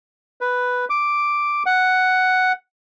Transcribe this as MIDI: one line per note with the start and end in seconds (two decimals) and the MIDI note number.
0.41 0.85 71
0.90 1.63 86
1.66 2.52 78